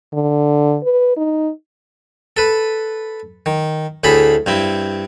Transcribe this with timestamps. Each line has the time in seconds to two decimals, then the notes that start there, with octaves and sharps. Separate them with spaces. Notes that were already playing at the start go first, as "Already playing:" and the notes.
0.13 D3
0.83 B4
1.17 D#4
2.37 A4 B4
3.46 D#3
4.04 D2 A2 G#4 A4 B5
4.46 G2 C4 E4